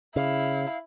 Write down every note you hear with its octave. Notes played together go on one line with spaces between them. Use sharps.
C#3 E4 F5